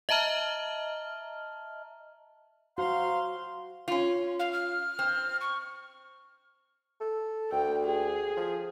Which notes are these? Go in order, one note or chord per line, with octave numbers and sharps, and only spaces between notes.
D#5 E5 A5 A#5 F6
F#4 C5 F5 A#5 C6
C#4 F4
F5
F6
C4
C#6
A4
D2 G5
G#4
F3